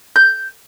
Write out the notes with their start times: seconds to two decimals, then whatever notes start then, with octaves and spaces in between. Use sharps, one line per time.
0.16 G6